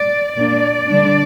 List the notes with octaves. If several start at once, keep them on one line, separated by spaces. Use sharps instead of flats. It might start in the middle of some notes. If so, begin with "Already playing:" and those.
Already playing: D5
A#2 A#3 D4 D5
D3 G3 D4